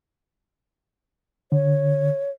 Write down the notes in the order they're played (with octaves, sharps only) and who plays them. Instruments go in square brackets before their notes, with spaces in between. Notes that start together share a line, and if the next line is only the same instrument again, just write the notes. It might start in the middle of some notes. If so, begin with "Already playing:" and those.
[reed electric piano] D3 [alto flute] C#5